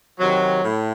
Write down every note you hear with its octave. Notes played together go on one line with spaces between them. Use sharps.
C3 D#3 F#3
A2